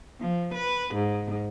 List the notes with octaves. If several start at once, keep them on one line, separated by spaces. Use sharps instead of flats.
F3
B4
G#2